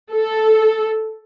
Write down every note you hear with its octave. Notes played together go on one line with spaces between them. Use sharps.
A4